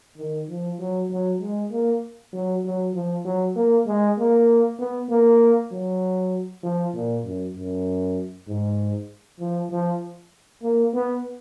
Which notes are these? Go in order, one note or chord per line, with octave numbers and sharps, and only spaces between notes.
D#3
F3
F#3
F#3
G#3
A#3
F#3
F#3
F3
F#3
A#3
G#3
A#3
B3
A#3
F#3
F3
A#2
F#2
F#2
G#2
F3
F3
A#3
B3